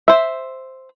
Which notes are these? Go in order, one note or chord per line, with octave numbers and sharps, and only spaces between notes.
C5 E5